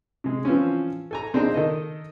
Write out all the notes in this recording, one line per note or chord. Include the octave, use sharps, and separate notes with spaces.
C3 G#3
E3 F3 C4 C#4
A4 G#5 A#5
A#1 C4 D4 D#4 G#4 A#5
D#3 A4 D#5